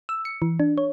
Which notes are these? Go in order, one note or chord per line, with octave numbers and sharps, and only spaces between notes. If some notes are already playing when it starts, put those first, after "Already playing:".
E6
C#7
E3
D4
C#5